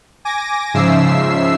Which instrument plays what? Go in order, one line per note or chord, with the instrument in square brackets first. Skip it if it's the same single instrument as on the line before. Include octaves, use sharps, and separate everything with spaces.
[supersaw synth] G#5 D6 A#6
G#2 C#3 F3 E5 E6 C7